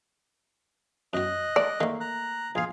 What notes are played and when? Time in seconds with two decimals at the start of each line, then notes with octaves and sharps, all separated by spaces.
1.13 F#2 F#4 D#5 F#6
1.56 A3 D5
1.80 D#3 A3 A#3
2.00 A#5 F#6
2.55 A#1 F4 G#4 F5